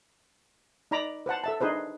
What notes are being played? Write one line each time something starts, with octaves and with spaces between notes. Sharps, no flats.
D#4 D5 A#5 B5 D6
B4 C5 F#5 A5
A4 E5 A5
D4 D#4 G#4 B4 C5